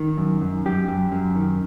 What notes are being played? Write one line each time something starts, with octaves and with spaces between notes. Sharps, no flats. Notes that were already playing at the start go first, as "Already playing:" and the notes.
Already playing: D#3
F#2
F#2
F#2 G4
F#2
F#2
D#3